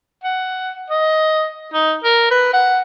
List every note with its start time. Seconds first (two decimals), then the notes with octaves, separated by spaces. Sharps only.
0.24 F#5
0.90 D#5
1.74 D#4
2.04 A#4
2.31 B4
2.53 F#5